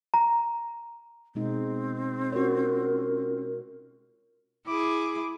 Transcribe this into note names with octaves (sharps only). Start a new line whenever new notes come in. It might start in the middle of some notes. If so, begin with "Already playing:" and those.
A#5
B2 G#3 C4 D#4
C#4 F4 F#4 A#4 C#5
E4 G#4 D6